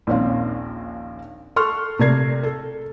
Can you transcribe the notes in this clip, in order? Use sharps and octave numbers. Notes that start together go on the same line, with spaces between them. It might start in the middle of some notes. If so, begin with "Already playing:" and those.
A#1 D#2 C4 C#4 F5
A4 C6 C#6 F6 F#6
C3 A3 A#4 D5 G#6 C7
A4